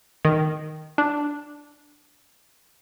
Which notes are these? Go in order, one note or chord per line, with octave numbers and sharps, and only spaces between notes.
D#3
D4